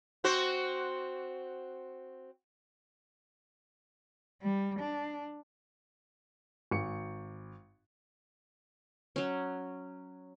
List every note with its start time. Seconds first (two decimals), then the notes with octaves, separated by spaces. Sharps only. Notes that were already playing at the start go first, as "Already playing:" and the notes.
0.24 C4 F#4 C5
4.42 G3
4.80 D4
6.71 G#1 C#7
9.16 F#3 C#4